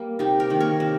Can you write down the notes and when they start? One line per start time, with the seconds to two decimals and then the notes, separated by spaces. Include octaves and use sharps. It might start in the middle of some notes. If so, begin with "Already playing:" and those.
Already playing: G3 A#3
0.19 C3 D#4 G4
0.40 G4 A#4
0.50 D#3 A#3
0.60 A#4 C#5
0.80 C3